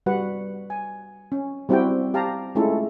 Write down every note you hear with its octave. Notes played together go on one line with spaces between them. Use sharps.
G3 F#4 B4 F#5
G#5
C#4
G3 C4 E4 F#4 G4 G5
G4 F5 A5 A#5
G#3 A3 C#4 E4 F4 A4